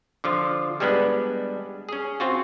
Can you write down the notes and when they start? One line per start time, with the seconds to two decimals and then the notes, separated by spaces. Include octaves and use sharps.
0.24 D3 F3 F4
0.80 G3 G#3 B3 D4 B4
1.89 C#4 G#4
2.20 C4 F4 F#4